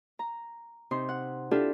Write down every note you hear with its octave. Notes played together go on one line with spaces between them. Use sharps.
A#5
C3 D#4 C6
F#5
D4 E4 F4 G4 A4